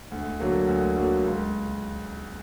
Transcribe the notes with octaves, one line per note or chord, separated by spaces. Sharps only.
D2
D3 F#3 A#3
D2
D3 F#3 A#3
C#2